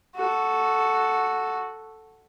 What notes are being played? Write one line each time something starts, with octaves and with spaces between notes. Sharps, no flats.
F#4 A4